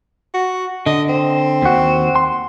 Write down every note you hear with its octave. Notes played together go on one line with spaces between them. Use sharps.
F#4
D3 D#5
C4
D#2 F#4
C6